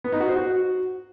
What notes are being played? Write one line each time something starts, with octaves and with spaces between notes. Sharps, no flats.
B3
D#4
F#4
C5
F#4